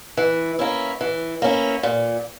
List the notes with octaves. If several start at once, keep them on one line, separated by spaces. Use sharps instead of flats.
E3
A#3 C#4 E4
E3
A#3 C#4 E4
A#2